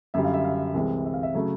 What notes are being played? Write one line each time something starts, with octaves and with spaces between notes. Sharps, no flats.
F#2 D3 G3 E5
F5
E5
F5
C2 C3 E3 G#3
E5
F5
E5
C#3 F#3 A3